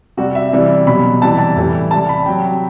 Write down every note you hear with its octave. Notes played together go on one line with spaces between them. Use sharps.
C3 G3 F#4
E5
C3 E3 G3
B2 F#3 B5
C3 E3 G3 A5
A5
A2 E3 G3
C3 G3 A5
B5
C3 F#3 G5